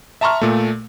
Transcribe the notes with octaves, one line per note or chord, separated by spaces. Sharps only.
E5 A5 A#5 C6 C#6 F6
A#2 A3